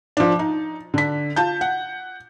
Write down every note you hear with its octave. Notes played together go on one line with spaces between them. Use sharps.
F3 D4
D#4
D3 B6
F4 A5 G6
F#5